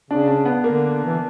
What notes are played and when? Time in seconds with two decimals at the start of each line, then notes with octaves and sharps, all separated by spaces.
0.11 C#3 D4
0.28 D4
0.45 B3
0.63 D3 A#3
1.05 E3